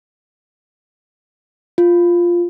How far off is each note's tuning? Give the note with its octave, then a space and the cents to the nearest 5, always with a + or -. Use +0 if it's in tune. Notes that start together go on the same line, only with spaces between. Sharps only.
F4 -5